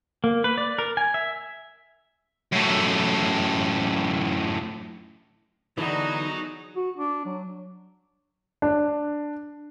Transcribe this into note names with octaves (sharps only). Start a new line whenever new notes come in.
A#3
B4
D5
A#4
G#5
E5
F#2 A2
D3 E3 F#3 B3 D4 D#4 G#4
F#4
D4
F#3
D4